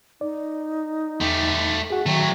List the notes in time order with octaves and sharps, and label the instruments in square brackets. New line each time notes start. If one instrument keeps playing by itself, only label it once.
[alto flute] D#4 [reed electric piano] D5
[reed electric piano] E2 [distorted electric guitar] A3 G4
[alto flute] F#4 [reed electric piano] G#4 F#5
[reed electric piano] D#3 [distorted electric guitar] F#3 A3 [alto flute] G5